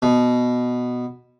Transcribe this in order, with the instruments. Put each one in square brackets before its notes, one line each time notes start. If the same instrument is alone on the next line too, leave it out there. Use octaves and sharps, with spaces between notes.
[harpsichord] B2